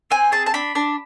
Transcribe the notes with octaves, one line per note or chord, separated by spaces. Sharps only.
C4 G#5
G#4 A5
A5
D4 B5
D4